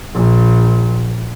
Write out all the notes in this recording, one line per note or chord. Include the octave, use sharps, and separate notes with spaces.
A#1